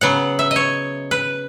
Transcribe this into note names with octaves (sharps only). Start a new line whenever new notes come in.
C#3 F#3 B3 F#5
E5
D#5
C#5
B4